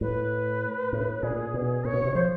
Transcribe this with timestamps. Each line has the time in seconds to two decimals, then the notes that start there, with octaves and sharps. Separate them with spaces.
0.01 A2 B4
0.93 A2
1.23 A#2 G#4
1.54 B2
1.85 A#2 C#5
1.94 B2
2.05 C3
2.15 F3 C5